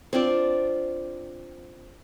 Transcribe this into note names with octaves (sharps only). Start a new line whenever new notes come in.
C4 D4 F4 D5